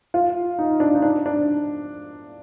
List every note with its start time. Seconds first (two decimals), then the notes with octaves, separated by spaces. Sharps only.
0.14 F4
0.59 D#4
0.80 D4
0.95 D#4
1.02 D4
1.26 D4